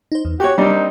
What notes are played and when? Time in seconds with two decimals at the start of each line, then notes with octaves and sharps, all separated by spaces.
0.12 D#4 C5
0.25 E2
0.40 F#4 G4 C#5 G#5 C#6 F#6
0.58 G3 A#3 C4 D4 D#4